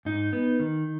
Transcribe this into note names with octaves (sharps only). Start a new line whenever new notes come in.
G#2 D#4
B3
D#3